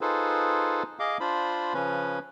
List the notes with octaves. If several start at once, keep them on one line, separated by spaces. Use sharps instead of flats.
D#4 F4 G#4 A4 B4 C5
G#4 D#5 F5 D6
D4 F4 C5 B5
C#3 F3 C#4 B4